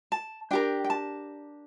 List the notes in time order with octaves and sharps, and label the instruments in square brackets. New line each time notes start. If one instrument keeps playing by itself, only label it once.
[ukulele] A5
D4 G4 A#4 G5
G5
A5